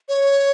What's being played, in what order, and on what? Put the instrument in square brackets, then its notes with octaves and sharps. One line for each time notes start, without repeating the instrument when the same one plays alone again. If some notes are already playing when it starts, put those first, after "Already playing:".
[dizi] C#5